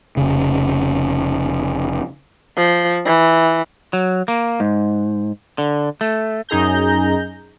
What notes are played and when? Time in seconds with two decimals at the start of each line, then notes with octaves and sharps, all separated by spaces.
0.17 F1 C#3
2.57 F3
3.05 E3
3.93 F#3
4.28 A#3
4.60 G#2
5.58 D3
6.01 A3
6.49 F#2 D#4 G#4 A#5 G6